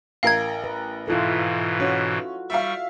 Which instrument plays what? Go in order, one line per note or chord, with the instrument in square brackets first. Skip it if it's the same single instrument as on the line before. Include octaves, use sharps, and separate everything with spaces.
[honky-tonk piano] A1 A#4 [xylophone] F5 G#6
[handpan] B4
[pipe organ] G#2 B2 E3 [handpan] E4 F4 A4
[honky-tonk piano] C#4 [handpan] F#4
[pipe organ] G3 C#6 [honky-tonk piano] E5 F5